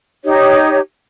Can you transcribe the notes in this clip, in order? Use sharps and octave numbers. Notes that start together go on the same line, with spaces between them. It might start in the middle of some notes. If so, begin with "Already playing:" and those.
D#4 G4 C#5